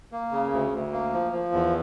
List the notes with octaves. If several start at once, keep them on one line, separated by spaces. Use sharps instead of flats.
A#3
C#3
D2
D2
A#3
F3
F3
E2